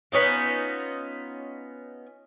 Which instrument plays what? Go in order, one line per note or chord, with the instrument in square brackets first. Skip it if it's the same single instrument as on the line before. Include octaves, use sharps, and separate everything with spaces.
[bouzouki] B3 C#4 D#4 F4